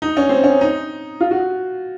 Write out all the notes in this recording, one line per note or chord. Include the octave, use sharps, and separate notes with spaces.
D#4
C#4
C4
C#4
D#4
F4
F#4